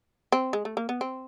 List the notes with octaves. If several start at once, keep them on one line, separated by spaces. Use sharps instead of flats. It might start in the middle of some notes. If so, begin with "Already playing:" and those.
C4
G#3
A3
A#3
B3
C4